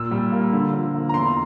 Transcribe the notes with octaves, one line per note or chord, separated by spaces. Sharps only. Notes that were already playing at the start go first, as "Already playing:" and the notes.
Already playing: A#2 E6
G3
A#3
D3
F3
A#3
A#5
E2 C6